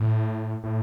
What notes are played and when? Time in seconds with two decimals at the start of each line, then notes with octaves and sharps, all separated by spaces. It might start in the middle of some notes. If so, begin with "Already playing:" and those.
Already playing: A2
0.64 A2